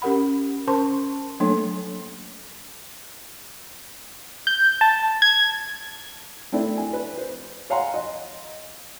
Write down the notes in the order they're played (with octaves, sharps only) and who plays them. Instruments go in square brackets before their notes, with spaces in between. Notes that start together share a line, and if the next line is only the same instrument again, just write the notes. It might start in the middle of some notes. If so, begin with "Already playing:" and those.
[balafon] C#4 G4 A#4 F#5 B5
C#4 A#4 C5 A5 C6 C#6
F#3 A3 A#3 D4 A4 C#5
[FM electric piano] G6
A5
G#6
[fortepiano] A3 C4 D4 E4
G#5
B4
C5
C#5 F5 F#5 G#5 A#5 C6
D#5